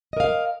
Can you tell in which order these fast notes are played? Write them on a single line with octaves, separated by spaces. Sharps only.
D#5 A#4 F5